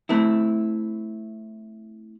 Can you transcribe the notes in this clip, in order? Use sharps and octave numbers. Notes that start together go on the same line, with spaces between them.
A3 C4 E4